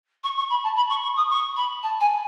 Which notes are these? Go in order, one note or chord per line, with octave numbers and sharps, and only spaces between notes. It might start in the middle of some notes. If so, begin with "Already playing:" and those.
C#6
C#6
B5
A5
B5
C#6
C#6
D#6
C#6
B5
A5
G#5